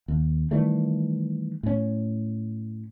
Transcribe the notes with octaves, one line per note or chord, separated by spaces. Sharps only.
D#2
D#3 E3 G3 A3
A2 C#4